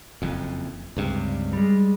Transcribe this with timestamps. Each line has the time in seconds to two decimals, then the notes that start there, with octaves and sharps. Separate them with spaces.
0.22 F#1 F2
0.97 C#2 G2 C3
1.53 G3 G#3